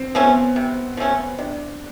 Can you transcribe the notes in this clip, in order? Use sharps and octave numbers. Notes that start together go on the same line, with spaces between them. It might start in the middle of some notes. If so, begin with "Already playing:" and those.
Already playing: C4
F3 A3 B3 C#4
C3
F3 A3 C#4
C3 D4